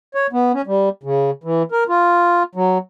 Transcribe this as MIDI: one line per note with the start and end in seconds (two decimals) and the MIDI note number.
0.15 0.27 73
0.33 0.52 59
0.54 0.62 61
0.67 0.89 55
1.04 1.31 49
1.44 1.63 52
1.72 1.84 70
1.89 2.43 65
2.55 2.78 54